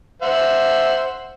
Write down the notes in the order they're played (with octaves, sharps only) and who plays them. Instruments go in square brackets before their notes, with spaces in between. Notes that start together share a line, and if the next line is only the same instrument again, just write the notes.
[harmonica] C5 E5 F#5